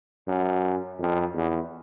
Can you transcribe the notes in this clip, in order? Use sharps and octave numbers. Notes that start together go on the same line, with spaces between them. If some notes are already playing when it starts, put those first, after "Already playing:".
F#2
F2
E2